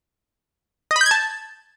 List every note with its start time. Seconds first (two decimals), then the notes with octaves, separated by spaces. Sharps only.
0.91 D#5
0.96 B5
1.01 G6
1.06 G#6
1.11 A5